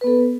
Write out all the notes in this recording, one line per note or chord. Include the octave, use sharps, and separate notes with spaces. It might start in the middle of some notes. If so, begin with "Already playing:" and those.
B3 A4 B4